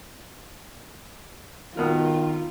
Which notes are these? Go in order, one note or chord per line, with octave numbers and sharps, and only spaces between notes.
B2 D#3 F4 A#4